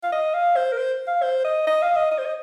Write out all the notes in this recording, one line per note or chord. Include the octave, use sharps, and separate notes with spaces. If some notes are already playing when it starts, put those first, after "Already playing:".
F5
D#5
F5
C5
A#4
C5
F5
C5
D#5
D#5
F5
D#5
D#5
C5
D#5